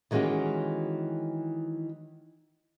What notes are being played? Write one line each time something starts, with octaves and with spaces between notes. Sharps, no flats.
D#3 E3 G#3 C#4 F#4 G4